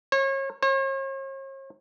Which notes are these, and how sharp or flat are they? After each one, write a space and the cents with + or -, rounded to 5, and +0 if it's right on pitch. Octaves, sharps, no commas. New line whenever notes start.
C#5 -35
C#5 -45